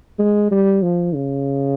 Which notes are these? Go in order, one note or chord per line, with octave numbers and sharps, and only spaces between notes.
G#3
G3
F3
C#3